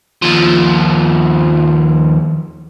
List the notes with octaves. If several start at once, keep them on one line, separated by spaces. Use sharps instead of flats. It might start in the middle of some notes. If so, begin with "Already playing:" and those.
D#2 F3